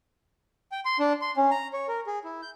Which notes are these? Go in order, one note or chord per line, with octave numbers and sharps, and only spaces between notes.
G5
C6
D4
C6
C#4
A#5
C#5
A#4
G#4
E4
G6